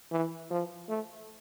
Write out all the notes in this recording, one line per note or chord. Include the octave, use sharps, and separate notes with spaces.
E3
F3
A3